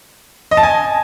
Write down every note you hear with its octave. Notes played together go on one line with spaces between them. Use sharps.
D#5
A5
G#5